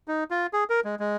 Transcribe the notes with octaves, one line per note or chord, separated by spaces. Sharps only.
D#4
F4
G#4
A#4
G#3
G#3